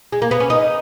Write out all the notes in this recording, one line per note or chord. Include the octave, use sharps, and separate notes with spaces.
G#3
A#3
B3
C#4
D#4